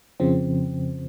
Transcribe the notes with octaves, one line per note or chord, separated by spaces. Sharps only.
F2 C#3 F3 C4